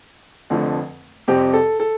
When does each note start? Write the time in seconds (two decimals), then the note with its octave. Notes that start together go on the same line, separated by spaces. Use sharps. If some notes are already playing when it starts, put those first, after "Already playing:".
0.50 F1 F2 D3 F3 A3
1.28 F2 C3 G3 C4 G4
1.54 A4
1.80 A4